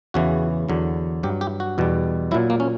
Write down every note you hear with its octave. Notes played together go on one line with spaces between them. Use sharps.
E2 C#3 E3 F#4
E2 D3 F#3
G2 F#3 G4
G4
F#4
E2 B2 G3
A#2 F#3 E4
A#3
C#4